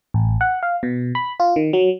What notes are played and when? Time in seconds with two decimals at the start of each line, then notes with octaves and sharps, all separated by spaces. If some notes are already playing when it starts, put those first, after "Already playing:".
0.14 A1
0.41 F#5
0.63 F5
0.83 B2
1.15 B5
1.40 F4
1.56 D#3
1.73 F#3